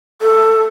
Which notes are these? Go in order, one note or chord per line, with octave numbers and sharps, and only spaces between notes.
A4